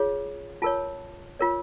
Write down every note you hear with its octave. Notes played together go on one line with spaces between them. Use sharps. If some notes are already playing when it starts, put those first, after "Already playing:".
Already playing: F4 G#4 C#5
F4 A#4 C#5 A5
F4 A#4 C#5